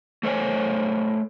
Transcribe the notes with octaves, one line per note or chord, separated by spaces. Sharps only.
A3 A4 C5 C#5 G#5